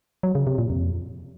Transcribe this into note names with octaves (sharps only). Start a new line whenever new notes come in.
F#3
C#3
C3
A#2
F2